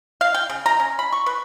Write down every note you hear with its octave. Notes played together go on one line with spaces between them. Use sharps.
F5
G5
C#3
A#5
C#4
B5
C#6
B4